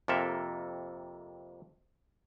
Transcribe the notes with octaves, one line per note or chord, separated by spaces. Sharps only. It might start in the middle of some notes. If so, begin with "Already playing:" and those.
F2 C3 A#3 A4 A#4 E5